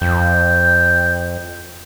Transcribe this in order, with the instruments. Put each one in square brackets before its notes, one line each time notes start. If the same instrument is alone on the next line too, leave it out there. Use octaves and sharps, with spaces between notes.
[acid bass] F2 [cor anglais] G5